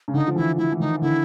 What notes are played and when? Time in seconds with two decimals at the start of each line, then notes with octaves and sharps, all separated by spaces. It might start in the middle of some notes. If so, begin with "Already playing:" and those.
0.08 C#3
0.14 D3 D#4
0.27 F3
0.36 E3 E4
0.58 E3 E4
0.72 E3
0.80 D#3 D#4
1.02 D3 E4